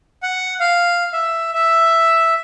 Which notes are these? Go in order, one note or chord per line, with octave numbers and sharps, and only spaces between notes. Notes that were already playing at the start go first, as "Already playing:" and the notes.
F#5
F5
E5
E5